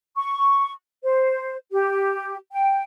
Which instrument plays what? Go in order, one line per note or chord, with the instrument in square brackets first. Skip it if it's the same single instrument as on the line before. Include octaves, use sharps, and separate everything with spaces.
[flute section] C#6
C5
G4
G5